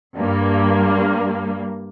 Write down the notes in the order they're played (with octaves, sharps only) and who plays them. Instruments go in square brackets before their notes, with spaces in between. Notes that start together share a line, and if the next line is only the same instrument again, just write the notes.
[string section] G2 A#3